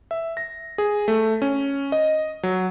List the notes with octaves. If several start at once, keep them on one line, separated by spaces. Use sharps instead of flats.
E5
A#6
G#4
A3
C#4
D#5
F#3